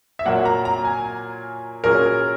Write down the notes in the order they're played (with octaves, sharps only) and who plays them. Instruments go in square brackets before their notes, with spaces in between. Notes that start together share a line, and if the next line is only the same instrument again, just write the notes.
[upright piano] E5
[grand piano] A#2 F#3 A#3 [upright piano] F#5
[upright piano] A#5
A#5
G#5
[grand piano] A#2 F#3 C#4 G#4 [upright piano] A#4